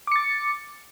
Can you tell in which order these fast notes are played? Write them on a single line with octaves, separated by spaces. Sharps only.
D6 C#7 A6